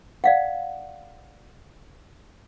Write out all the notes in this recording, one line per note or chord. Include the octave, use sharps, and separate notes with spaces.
D5 F5 F#5